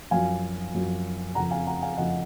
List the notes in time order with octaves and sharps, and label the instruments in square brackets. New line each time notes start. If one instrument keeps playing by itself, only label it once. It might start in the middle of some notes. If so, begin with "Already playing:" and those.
[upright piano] F#2 F3 F5 G#5
F#2 F3
F2 C#3 F3 F#5 A#5
F5 G#5
F#5 A#5
F5 G#5
F2 C#3 F3 D#5 F#5